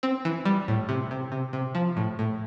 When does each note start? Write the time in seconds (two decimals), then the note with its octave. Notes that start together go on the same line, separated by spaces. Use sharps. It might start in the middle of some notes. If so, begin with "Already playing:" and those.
0.03 C4
0.25 E3
0.45 G3
0.68 A2
0.89 C3
1.11 C3
1.32 C3
1.53 C3
1.75 F3
1.97 A2
2.19 A2